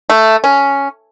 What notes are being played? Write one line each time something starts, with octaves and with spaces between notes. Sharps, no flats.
A3
C#4